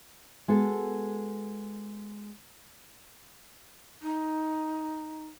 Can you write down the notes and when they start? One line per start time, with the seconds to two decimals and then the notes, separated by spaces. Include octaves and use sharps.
0.48 G#3 B3 F#4 A4
4.02 D#4